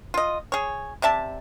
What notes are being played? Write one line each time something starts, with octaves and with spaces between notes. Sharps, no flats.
F4 D#5
G#4 C#5
C3 D5 E5 A5